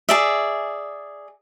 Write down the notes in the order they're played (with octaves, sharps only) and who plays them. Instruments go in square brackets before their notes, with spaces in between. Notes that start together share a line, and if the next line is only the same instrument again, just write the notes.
[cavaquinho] G#4 D5 E5